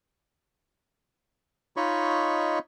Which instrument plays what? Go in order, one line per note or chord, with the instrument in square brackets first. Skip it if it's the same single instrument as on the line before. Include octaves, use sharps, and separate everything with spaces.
[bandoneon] D#4 F4 C#5 D#5 B5 C#6